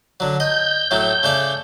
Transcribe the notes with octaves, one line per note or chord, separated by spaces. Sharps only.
D3 F#3
D#5 G6
A2 F#3 A3
C#3 A3 D5